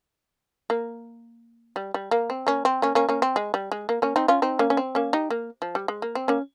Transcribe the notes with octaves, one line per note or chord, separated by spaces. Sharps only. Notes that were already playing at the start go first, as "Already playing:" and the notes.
A#3
G3
G3
A#3
C4
A#3 C#4
C4
A#3 C#4
A#3 C#4
A#3 C#4
C4
G#3
G3
G#3
A#3
A#3 C#4
C4 D#4
C#4 F4
C4 D#4
A#3 C#4
C#4
C4
A#3 C#4
D#4 G4
A#3
F3
G3
G#3
A#3
C4
A#3 C#4